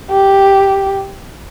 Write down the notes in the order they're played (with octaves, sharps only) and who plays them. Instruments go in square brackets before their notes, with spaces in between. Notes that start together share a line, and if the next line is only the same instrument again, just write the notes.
[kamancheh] G4